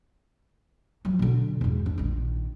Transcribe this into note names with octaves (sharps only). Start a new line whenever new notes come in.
F3 F#3
B2 D3
E2 G#2
D4
A#1 D#3